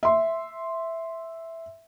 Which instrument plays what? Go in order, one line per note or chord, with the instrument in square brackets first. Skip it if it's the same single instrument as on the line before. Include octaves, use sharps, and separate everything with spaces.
[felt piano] E5 C6